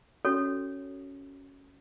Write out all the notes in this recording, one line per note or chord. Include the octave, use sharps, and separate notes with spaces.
C#4 F#4 A4 C#5